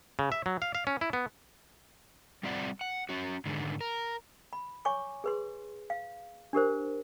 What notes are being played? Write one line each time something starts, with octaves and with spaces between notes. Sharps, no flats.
C#3
E5
F#3
F5
F5
C#4
E4
B3
G3 C4 F4 D5 F#5
F#5
C#4 F#4
G#2 D3 D#3 G#3
A#4
B5
C#5 G#5 C#6 D6
G#4 B4 C6
F5
D4 G4 A#4 C5